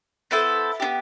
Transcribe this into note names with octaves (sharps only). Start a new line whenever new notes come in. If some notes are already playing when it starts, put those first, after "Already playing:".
B3 E4 A4 C5
B3 D4 G4